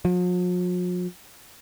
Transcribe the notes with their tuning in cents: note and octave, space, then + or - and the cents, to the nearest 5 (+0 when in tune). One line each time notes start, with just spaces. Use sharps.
F3 +45